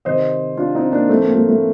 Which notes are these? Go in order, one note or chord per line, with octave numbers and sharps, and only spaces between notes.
C3 D#3 C5 D#5
D4 F4
C4 D#4
A#3 D4
A2 F3 A3 C4
A#3
A3
A3